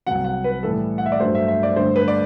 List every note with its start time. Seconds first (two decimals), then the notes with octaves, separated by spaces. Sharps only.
0.07 C2 C3 F#3 F#5
0.24 F#5
0.44 B4
0.63 A2 E3 G3 A4
0.98 F#5
1.06 E5
1.12 D5
1.20 G2 F#3 A3 D4 C5
1.35 E5
1.48 E5
1.63 D5
1.76 G2 D3 A3 D4 C5
1.96 B4
2.08 D5